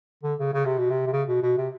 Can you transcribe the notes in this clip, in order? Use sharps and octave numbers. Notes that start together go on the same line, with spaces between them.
D3
C#3
C#3
C3
B2
C3
C3
C#3
B2
B2
C3